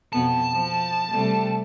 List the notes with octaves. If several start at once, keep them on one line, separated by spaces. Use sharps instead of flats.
F2 B2 B3 A5
F3
C3 G3 A3